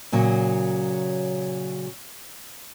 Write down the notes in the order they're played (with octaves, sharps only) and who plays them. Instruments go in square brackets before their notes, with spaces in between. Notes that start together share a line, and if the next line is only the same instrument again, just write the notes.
[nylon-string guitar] A#2 C#3 F#3